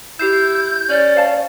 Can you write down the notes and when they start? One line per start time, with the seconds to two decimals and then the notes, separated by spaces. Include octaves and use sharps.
0.19 E4 G4 G6 C7 E7
0.89 C#4 D5
1.16 C5 F5 A5